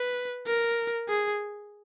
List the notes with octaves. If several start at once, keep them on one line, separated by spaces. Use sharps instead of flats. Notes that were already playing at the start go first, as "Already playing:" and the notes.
Already playing: B4
A#4
G#4